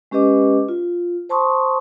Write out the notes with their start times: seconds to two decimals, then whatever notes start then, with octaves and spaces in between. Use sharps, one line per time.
0.11 G#3 C#4 G4 B4 D#5 D6
0.69 F4
1.29 C5 A5 C6 C#6 D#6